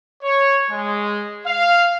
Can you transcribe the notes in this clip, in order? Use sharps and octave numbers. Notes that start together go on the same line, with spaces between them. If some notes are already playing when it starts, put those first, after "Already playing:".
C#5
G#3
F5